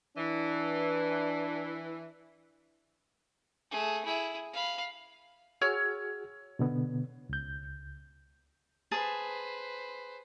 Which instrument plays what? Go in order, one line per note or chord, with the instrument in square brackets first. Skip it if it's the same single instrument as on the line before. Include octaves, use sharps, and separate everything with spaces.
[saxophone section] E3 [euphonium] D4
[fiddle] A3 G#4
E4 G#4
F5 B5
[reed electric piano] F#4 G#4 [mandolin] C#5 E6 F6
[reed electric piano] B2 D3 B3
C#2 G6
[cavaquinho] G#4 A5 D#6 [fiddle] B4 C5